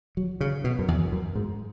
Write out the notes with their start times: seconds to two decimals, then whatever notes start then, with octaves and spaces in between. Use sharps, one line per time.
0.17 F#3
0.41 C#3
0.64 B2
0.79 F#2
0.88 E2
1.12 F#2
1.35 G#2